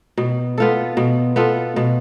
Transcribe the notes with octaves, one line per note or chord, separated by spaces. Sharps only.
B2
B3 F4 A4
B2
B3 F4 A4
B2